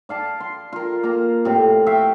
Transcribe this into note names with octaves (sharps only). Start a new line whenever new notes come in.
D5 F5 A5
C6
F4 A#4
A#3 A#5
A2 C3
E5 F5 G5 C#6